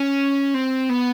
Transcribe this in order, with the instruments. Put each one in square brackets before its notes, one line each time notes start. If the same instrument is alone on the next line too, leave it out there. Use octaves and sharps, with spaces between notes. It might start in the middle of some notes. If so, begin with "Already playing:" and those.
Already playing: [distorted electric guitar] C#4
C4
B3